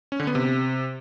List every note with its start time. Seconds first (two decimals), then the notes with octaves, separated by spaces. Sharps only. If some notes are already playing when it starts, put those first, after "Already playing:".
0.12 C#4
0.20 D3
0.27 B3
0.35 C3